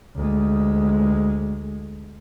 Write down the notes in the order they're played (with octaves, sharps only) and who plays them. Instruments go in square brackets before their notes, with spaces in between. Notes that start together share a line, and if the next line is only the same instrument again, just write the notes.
[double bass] D2 G#3